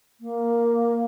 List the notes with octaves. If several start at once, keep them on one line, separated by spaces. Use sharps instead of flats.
A#3